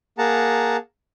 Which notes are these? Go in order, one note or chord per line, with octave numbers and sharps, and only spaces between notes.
A#3 G#4 F#5 A5 A#5